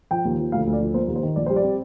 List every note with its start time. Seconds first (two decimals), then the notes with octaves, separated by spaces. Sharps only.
0.11 F3 G5
0.25 D#2
0.39 F3
0.52 D2 F5
0.67 D2
0.73 D5
0.81 F3
0.94 A#3 C5
1.08 D#2
1.16 C5
1.23 D#3
1.36 A#1 D5
1.46 G3 C5
1.56 D5
1.64 C4